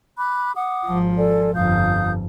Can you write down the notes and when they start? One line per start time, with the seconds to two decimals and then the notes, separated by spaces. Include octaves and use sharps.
0.17 B5 D6 F#6
0.56 F#5 D6 D#6
0.85 G#1 F3
1.17 A4 D5 G#5
1.55 G1 F2 F5 D#6 G6